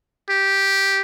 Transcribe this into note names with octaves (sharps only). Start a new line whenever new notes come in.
G4